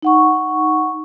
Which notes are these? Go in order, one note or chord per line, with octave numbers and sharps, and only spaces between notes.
D#4 F#5 C#6